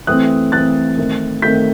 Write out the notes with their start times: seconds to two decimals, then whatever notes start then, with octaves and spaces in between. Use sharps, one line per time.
0.07 E3 A3 C4 D#6 F#6
0.52 E3 A3 C4 F#6 A6
0.98 D#3 A3 C4
1.42 D#3 A3 C4 G6 B6